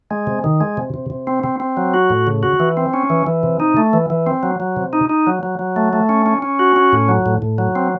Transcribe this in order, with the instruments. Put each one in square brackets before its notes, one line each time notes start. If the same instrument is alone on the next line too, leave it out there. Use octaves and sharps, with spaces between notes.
[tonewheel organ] G#3
C3
D#3
G#3
C3
C3
C3
C4
C4
C4
F#3
F#4
A2
C#3
F#4
E3
C4
C#4
E3
E3
C3
D#4
A3
E3
E3
C4
F#3
F#3
C3
D#4
D#4
F#3
F#3
F#3
A3
A3
C#4
C#4
C#4
F#4
C#4
A2
F#3
A2
A2
F#3
C4